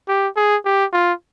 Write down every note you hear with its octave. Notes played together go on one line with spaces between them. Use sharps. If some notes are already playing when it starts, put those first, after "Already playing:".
G4
G#4
G4
F4